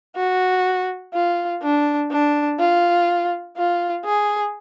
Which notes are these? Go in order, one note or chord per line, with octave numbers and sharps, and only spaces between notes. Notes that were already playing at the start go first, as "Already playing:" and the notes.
F#4
F4
D4
D4
F4
F4
G#4